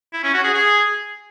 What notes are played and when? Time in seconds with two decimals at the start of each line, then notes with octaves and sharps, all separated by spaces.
0.13 E4
0.23 C#4
0.34 F#4
0.44 G#4
0.54 G#4